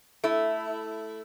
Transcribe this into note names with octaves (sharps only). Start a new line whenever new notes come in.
A3 E4